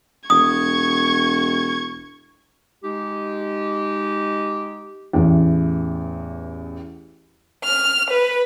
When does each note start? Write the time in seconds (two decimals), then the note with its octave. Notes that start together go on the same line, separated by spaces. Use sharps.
0.30 E1 C#6 D#6 G#6
2.83 G#3 D#4 G4
5.13 A1 E2
7.64 F6
8.10 B4